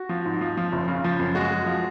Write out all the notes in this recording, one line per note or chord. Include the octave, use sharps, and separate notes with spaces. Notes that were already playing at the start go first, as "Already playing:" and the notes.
Already playing: F#4
F3
G#2
F3
F3
F#1
C#3
F3
F#2
G#3 F#4
G#3
F3